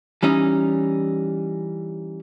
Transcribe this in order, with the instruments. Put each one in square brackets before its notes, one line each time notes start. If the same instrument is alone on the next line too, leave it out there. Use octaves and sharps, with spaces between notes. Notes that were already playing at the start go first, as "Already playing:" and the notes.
[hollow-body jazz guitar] E3 G3 C#4 D#4